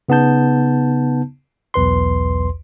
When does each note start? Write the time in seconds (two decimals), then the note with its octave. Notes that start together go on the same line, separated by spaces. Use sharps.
0.09 C#3 B3 D#4 A5 G6
1.74 B1 E2 B4 C6